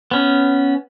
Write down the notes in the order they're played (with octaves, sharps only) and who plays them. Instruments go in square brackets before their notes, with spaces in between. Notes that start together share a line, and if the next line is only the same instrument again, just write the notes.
[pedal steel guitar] B3 C#4